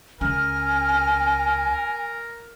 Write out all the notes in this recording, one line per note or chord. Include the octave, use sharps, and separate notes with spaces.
C#2 C#4 A#4 G#5 F6